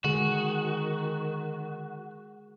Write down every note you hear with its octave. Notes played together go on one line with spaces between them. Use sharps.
D3 D#3 G#3 F#4 G#4